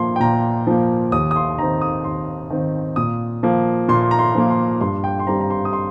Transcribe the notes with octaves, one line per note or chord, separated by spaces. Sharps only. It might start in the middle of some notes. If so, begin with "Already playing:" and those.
Already playing: A#2 F3 A#3 C6
G5
A#2 A#5
F3 A#3
D#2 D#6
D#6
C6
D#3 C4 A#5
D#6
D#2 C6
D#3 C4
A#2 D#6
F3 A#3
A#2 C6
A#5
C6
F3 A#3
C6
G2 C6
G5
C6
G3 C4 A#5
A#5
C6
D#6
C6